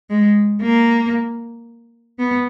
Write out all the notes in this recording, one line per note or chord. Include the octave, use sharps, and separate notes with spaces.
G#3
A#3
B3